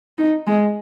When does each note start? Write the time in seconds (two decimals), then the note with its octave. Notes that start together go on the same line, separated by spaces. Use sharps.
0.18 D#4
0.47 G#3